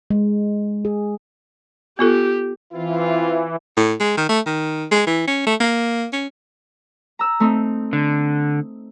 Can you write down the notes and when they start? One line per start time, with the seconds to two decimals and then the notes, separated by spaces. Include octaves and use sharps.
0.11 G#3
0.85 G#4
1.99 B3 F4 G4 A4
2.73 E3 C4 E4 F4
3.77 A2
4.00 G#3
4.17 D#3
4.29 A3
4.46 D#3
4.91 G#3
5.07 E3
5.27 C#4
5.47 A3
5.60 A#3
6.13 C#4
7.19 A#5 E6
7.40 A3 C4 D#4
7.93 D3